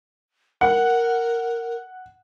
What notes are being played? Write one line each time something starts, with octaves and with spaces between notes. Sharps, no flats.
A#4 F#5